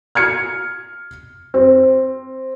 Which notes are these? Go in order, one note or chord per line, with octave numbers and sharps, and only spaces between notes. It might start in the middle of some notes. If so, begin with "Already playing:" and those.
F6 G#6 C#7
C4